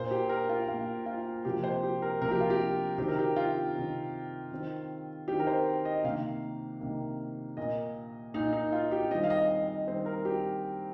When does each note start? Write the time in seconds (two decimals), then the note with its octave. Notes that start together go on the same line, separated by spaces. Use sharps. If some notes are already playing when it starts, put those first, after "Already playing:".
Already playing: A#2 A#3 C5
0.11 G4
0.29 A#4
0.49 F4
0.68 A#2 A#3 F4
1.06 F4
1.45 C3 F3 A#3 G4
1.64 C5
1.83 G4
2.02 A#4
2.22 C3 F3 A#3 A#4
2.31 G4
2.41 F4
2.50 G4
2.98 C3 D#3 C4 G4
3.08 A#4
3.19 G4
3.36 F4
3.75 C3 D#3 C4
4.51 D#3 C4
5.28 D#3 C4 G4
5.40 A#4
5.47 C5
5.85 D#5
6.04 C3 D#3 A#3 F5
6.81 C3 D#3 A#3
7.57 A#2 A#3 D#5
8.34 A#2 A#3 D#4
8.53 D#4
8.72 F4
8.91 G4
9.11 D#3 G3 C4 D#5
9.24 F5
9.30 D#5
9.49 D#5
9.67 D#5
9.87 D#3 G3 C4 C5
10.06 A#4
10.25 G4